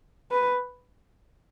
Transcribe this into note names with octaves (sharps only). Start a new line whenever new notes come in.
B4